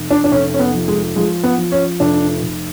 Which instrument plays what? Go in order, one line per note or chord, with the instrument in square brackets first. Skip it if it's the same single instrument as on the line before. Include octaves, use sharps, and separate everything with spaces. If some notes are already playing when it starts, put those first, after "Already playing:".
Already playing: [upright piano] F1
D4
D4
F1 C#4
C#4
B3
F3
G#3
F3 G#3
B3
F3
C#4
F1 D4
F1